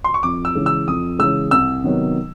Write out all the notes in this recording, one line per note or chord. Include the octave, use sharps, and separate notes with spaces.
C6
C#6
F2 D6
E6
C#3 E3 G#3
E6
F2 D#6
C#3 E3 G#3 E6
C2 E6
C3 D#3 F#3 B3